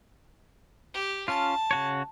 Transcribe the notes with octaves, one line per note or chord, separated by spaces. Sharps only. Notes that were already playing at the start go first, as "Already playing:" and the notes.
G4
C#4 F4 A5
C#3 F#4 C#5